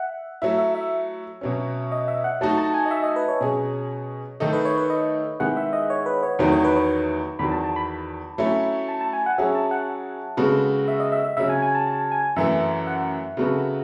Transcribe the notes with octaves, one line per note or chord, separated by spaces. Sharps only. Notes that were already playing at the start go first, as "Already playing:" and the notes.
Already playing: E5 F#5
F#3 A3 E4 E5
E5
E5
B2 F#3 C#4
D#5
E5
F#5
F#3 A3 D#4 F#4 A5
A5
G#5
D#5
E5
D#5
B4
C#5
B2 F#3 C#4 G#4
D#3 A3 D#4 A4 D#5
B4
C#5
B4
D#5
D#3 G#3 B3 E4 G#4 F#5
E5
D#5
C#5
B4
C#5
E2 D#3 F#3 A3 D#4 B4
C#5
B4
C#5
E2 D#3 F#3 B5
A5
A5
B5
F#3 A3 C#4 E4
A5
A5
G#5
F#5
F#3 C#4 G#4 E5
A5
F#5
C#3 G#3 B3 F#4 A4
E5
D#5
E5
E5
C#3 F#3 C#4 E5
G#5
G#5
A5
A5
G#5
F#2 E3 A3 E5
F#5
C#3 F#3 B3 F#4 A4